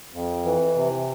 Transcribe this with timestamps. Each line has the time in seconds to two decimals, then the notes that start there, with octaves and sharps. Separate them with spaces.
0.13 F2
0.45 E3
0.76 C3